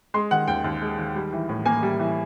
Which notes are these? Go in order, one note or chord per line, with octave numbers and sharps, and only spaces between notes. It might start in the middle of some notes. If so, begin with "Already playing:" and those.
G#3 C6
D#3 F#5
D#2 G5
D#2
G#3
D#3
G3
E3
A2
A#3 G#5
G3
E3